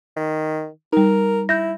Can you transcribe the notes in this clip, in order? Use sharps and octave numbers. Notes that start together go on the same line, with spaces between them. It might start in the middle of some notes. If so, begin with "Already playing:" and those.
D#3
G3 D#4 A#4
E4 G6 A#6